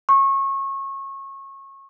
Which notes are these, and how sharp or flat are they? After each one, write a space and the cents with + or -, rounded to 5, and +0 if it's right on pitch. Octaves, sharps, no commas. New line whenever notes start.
C#6 -25